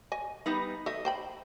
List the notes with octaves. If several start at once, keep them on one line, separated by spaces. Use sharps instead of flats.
D#5 G#5
G3 B3 D#4
A4 D#5 E5
C5 G5 B5